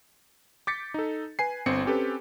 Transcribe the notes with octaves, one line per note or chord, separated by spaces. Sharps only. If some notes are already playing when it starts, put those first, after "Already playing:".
D6 G6 A6 B6 C#7
D#4 A4
B4 G#5 C7
G1 C4 C#7
C4 C#4 G4 A4 B4